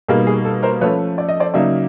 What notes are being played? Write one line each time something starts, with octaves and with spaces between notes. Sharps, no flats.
B2 G3 A#3 D#4 G#4 A#4
G#4
A4
A#4 C5
F3 A3 C#4 B4 C#5
D5
D#5
C5 D5
C#3 F#3 A#3 D#4 D5 E5